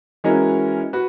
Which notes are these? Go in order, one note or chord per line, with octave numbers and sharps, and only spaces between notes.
E3 G#3 C#4 F#4 A#4
F#4 B4